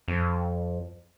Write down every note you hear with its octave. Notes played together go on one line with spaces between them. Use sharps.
F2